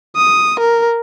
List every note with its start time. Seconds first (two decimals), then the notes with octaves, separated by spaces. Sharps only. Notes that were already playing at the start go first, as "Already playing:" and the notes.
0.16 D#6
0.60 A#4